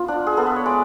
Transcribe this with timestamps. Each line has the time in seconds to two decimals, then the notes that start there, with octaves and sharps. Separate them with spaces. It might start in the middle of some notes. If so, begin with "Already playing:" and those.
Already playing: B3 F4
0.08 D4
0.27 G#4
0.37 B3 A4
0.47 B4
0.56 C#5
0.66 G#3 D5